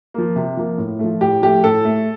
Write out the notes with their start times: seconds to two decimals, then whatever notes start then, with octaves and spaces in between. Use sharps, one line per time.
0.14 F3 A#3
0.36 C3
0.57 F3 A#3
0.78 A2
0.99 F3 A3
1.21 A2 G4
1.42 F3 A3 G4
1.64 A2 A4
1.85 A3